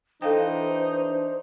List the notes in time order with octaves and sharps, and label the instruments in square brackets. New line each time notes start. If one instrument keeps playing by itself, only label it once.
[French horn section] E3 D4 [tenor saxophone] D#4 [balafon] A4 F5 G5 [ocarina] C5